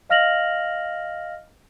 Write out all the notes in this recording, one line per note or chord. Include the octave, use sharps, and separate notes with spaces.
D#5 F5 F6 A#6 F7 F#7